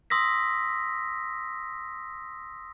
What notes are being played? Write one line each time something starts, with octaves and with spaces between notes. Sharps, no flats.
C6 D#6 E6 A#6 B6